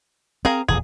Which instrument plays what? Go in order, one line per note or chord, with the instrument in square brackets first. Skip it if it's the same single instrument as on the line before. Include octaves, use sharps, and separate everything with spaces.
[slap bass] C4 [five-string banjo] G#4 A#4 F5
[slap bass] D#1 E2 A#2 [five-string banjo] G#4